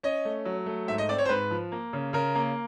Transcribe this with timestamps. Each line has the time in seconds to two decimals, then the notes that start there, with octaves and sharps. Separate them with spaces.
0.03 C#4 D#5
0.25 A3
0.45 F#3
0.66 A3
0.88 G#2 E5
0.98 D#5
1.09 C4 D5
1.18 C#5
1.25 C5
1.29 G#2 B4
1.51 F3
1.72 A#3
1.93 C#3
2.13 C#3 A#4
2.35 A#3